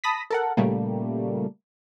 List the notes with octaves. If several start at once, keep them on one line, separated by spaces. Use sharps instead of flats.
A5 B5 D#6 A#6 B6
A4 A#4 F#5
A#2 C#3 G3 A3 A#3